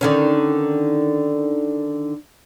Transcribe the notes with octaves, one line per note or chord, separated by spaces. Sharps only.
D3 D#3 C#4